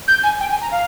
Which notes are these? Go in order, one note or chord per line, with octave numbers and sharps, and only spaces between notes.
G6
G#5
G5
G#5
A#5
F5